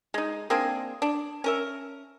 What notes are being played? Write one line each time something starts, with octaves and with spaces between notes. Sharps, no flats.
G#3 D#4
A#3 C4 D4 G#4
D4
C#4 A#4 E5